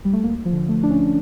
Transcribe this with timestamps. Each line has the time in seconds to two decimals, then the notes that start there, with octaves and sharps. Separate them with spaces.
0.05 G3
0.13 A3
0.24 D2 A#3
0.45 F3
0.53 D3
0.68 A3
0.83 D2 D4
0.90 C#4